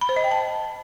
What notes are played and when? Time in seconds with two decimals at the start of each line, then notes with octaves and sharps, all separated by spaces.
0.01 B5
0.09 C5
0.16 D#5
0.24 G5
0.31 A5